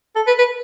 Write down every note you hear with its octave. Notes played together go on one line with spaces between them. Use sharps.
A4
B4
B4